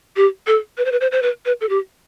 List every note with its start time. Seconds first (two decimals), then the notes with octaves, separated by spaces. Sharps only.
0.16 G4
0.47 A4
0.78 B4
0.85 C5
0.92 B4
1.01 C5
1.12 C5
1.22 B4
1.46 B4
1.61 A4
1.69 G4